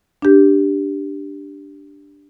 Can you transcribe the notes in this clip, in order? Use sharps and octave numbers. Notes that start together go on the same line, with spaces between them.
D4 G4